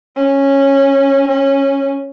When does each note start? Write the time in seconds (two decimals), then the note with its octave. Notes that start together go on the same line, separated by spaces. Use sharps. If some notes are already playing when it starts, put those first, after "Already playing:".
0.17 C#4
1.28 C#4